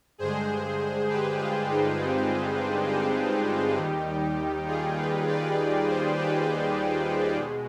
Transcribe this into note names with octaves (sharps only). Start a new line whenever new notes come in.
G2 D3 G#3 G#4 C5
G4 B4
F4 G#4
D#4 G4
C4 D#4
D4
D#4 G4
D#2 D#3 G3
F4 G#4
G4 B4
B4 D5
B4 D5
G#4 C5
G4 B4
B2 G#3